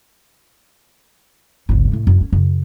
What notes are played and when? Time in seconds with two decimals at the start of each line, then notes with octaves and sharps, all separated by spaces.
1.69 G1 C#2
1.92 A2 A3
2.07 F#2
2.21 C#4
2.32 F#2 C#3